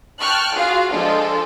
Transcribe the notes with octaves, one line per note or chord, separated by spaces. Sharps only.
G5 A5 C#6 F6 F#6
F4 F#4 G#4 F5
F3 G#3 D4 F4 A4